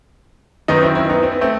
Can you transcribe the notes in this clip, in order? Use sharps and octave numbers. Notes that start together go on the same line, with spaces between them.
F#2 D#3 B3 D#4
C4 E4
C4 E4
B3 D#4
C4
B3
A3 C4